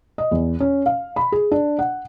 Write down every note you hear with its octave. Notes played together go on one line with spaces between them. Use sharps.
D#5
E2
C#4
F5
B5
G#4
D4
F#5